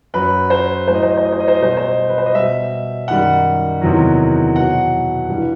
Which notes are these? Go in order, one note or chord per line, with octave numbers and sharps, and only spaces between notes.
F#2 F#3 B4
C5
A2 F#3 C5
D#5
C5
D#5
C5
D#5
C5
D#5
C5
D#5
B2 G3 C5
D#5
C5
B4
C5
D#5
B2 G3 E5
F#2 D#3 G3 F#5
E2 C3 D#3 F#3
B2 F#3 F#5
G2 E3 G3